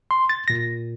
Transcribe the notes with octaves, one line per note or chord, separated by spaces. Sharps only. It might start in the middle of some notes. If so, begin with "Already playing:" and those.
C6
A6
A#2 A#6